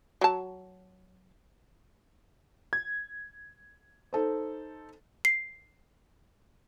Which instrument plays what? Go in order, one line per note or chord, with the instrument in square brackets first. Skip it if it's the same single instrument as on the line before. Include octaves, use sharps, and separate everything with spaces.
[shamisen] F#3 A5
[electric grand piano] G#6
[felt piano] D#4 A4 C5
[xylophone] C7